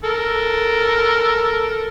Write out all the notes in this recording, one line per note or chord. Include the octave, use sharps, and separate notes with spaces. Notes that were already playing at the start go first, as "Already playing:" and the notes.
A4 A#4